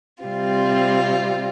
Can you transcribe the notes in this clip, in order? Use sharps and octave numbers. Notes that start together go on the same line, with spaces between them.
C3 G3 C4 F4